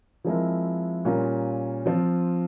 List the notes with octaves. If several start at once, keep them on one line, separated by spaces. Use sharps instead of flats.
F3 G#3 C4 E4 A#4
A#2 G3 C#4 F4 A#4
F3 C4 F4